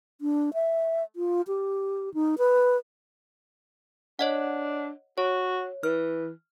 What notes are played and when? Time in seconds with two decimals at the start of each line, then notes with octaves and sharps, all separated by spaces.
0.21 D4
0.54 E5
1.16 F4
1.47 G4
2.14 D#4
2.38 B4
4.19 D4 C#5 D#5 F#5
5.18 F#4 C#5
5.83 E3 F6